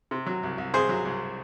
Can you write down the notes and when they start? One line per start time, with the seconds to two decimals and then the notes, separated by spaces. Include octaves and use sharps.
0.11 C3
0.26 F#3
0.43 C2
0.58 C2
0.74 C3 G#4 C5
0.89 F#3
1.05 C2